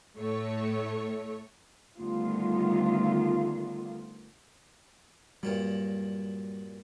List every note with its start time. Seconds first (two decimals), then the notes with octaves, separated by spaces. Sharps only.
0.16 A2 A3 C#5
1.98 D2 D3 D#3 G3 B3 F4
5.43 G2 A#2 F#3 G3